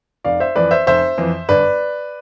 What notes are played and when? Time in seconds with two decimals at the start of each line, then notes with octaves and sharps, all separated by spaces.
0.24 F1 D5 F5
0.40 C5 E5
0.56 F2 E3 B4 D5
0.71 C5 E5
0.86 F1 C5 E5
1.18 F2 E3
1.49 G1 B4 D5